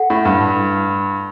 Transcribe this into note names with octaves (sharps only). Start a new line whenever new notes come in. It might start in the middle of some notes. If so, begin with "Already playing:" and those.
Already playing: A4 F#5
A2
G2